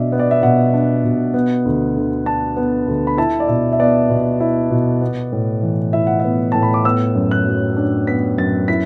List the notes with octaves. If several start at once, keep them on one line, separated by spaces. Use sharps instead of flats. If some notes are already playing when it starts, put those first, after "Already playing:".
Already playing: B2 D4 D5 E5
B3
D5
E5
B2 F#5
D4
B2
B3
D2
D3
D4 A5
B3
D2
B5
E4 A5
D5
B2 E5
E5
B3 D5
B2
E4
B2
B3
A2
E3
E4 E5
F#5
B3 E5
A2 A5
B5
D6
B3 E6
F#2
F#6
F#3
D4
B3 B6
F#2 A6
E4 B6